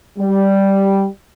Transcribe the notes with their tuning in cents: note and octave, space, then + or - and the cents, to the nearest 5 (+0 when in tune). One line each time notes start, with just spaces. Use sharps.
G3 -5